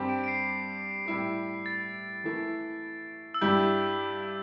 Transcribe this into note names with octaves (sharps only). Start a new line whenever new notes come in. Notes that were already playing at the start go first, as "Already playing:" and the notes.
Already playing: G2 G3 C4 G4
D7
D7
C7
A2 G3 E4 G4
A6
E3 A3 E4
E6
G2 G3 E4 G4 G6